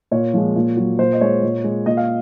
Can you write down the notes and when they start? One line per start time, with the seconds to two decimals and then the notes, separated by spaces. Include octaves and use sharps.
0.11 A#2 C#5
0.34 F3 G#3
0.56 A#2
0.77 F#3
0.99 A#2 C5
1.13 D#5
1.21 G#3 C#5
1.43 A#2
1.64 G#3
1.86 A#2 D#5
1.97 F5